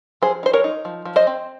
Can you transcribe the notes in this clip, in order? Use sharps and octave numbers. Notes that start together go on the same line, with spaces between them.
F3 G#4 C5
D#4 C5
A#4 C#5
D#4
F3
F3
C5 D#5
C4